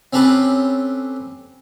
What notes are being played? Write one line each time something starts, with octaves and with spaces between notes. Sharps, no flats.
C4 C#4 G4 A4 B4